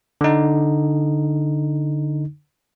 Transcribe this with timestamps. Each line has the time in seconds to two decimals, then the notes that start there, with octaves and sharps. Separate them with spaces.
0.21 D3 D#4